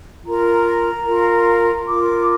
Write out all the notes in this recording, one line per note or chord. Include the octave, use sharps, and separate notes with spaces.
F4 A#4 A#5
F4 A#4
F4 A#4 D6